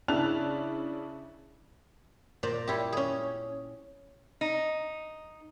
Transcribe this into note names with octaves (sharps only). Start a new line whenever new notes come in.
C#3 D4 E4 A5 F#6 F7
A#2 C5 D5 A#5
G3 E4 G4
C#4 G#4
D#4